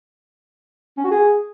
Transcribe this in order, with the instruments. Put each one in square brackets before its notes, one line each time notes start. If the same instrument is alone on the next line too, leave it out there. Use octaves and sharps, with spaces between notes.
[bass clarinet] C#4
F#4
G#4